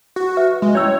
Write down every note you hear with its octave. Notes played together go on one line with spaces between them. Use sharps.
F#4
B4 E5
G#3
C#4 E4 C#5 E6